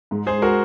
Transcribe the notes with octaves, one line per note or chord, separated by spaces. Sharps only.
G#2
G#3 G#4 C5
F#4 A#4